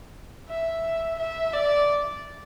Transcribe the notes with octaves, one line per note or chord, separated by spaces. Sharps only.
E5
E5
D5